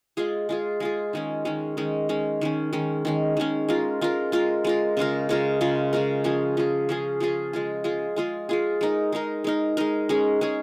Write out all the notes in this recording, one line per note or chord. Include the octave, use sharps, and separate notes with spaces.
G#3 F4 G#4
G#3 F4 G#4
G#3 F4 G#4
D#3 G#3 C#4
D#3 G#3 C#4
D#3 G#3 C#4
D#3 G#3 C#4
D#3 G#3 C#4
D#3 G#3 C#4
D#3 G#3 C#4
D#3 G#3 C#4
G#3 F4 A#4
G#3 F4 A#4
G#3 F4 A#4
G#3 F4 A#4
C#3 G#3 F4 A#4
C#3 G#3 F4 A#4
C#3 G#3 F4 A#4
C#3 G#3 F4 A#4
F3 C#4 F4 G#4
F3 C#4 F4 G#4
F3 C#4 F4 G#4
F3 C#4 F4 G#4
G#3 F4 G#4
G#3 F4 G#4
G#3 F4 G#4
G#3 F4 G#4
G#3 D#4 A#4
G#3 D#4 A#4
G#3 D#4 A#4
G#3 D#4 A#4
G#3 C#4 G#4
G#3 C#4 G#4